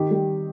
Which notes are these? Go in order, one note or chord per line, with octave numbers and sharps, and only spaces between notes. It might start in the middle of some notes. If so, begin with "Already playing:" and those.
Already playing: D#3 G4
G3